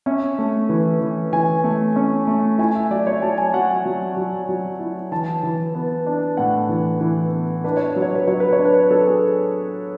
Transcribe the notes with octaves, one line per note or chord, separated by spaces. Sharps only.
C#4 E5
A3
E3
E3
E3 G#5
A3
C#4
A3
E4 G#5
E5
F#3 D5
C#5
F#3 A5
G#5
F#3 F#5
G#5
F#3
F#3
F#3
E4
E3 A5
E3
B3
D4
A2 F#5
E3
E3
B3
D4 B4
C#5
B4
F#3
C#5
B4
F#3 C#5
B4
C#5
D4
B4
F#3 A4
G#4